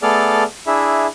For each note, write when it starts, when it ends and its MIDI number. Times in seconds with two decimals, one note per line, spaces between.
0.03 0.44 57
0.03 0.44 59
0.03 0.44 68
0.03 0.44 69
0.03 0.44 74
0.03 0.44 89
0.67 1.06 62
0.67 1.06 64
0.67 1.06 68
0.67 1.06 76